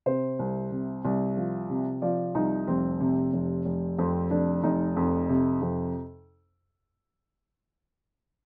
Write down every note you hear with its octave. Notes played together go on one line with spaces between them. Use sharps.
C3 C5
C2
C3
C2
F3
C3
F3 D5
C2 D#4
F1 C4
C3
F1
F1
F2 C4
F1 D4
F1 D#4
F2
C3
F2